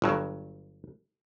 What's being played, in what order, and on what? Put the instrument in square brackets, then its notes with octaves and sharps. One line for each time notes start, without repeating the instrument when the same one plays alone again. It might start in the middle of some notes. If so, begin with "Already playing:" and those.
[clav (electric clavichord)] G1 G2 F#3